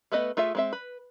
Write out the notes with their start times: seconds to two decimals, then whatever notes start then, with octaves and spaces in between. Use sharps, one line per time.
0.12 A3 B3 B4 D#5
0.37 A3 F4 G#4 E5
0.55 G#3 C4 E5
0.73 B4